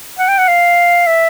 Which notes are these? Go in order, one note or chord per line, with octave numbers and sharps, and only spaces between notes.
F#5
G5
F#5
F5
E5